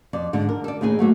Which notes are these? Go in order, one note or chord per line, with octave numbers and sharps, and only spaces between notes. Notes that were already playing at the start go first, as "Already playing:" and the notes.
F2 D5
G#2 D3
A#4
A4 D5
D#2 A2 D#4 G#4 G#5
F#3 A3 A#3